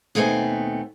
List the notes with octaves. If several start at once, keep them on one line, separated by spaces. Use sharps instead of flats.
D#2 B2 A3 B3 C4 G#5